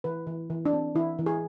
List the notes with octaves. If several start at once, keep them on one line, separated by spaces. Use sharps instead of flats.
E3 B4
E3
E3
D4
C4
E3 E4
E3
G#4